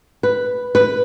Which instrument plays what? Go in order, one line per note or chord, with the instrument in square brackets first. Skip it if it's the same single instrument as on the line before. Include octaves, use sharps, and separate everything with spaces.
[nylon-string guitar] B4
B4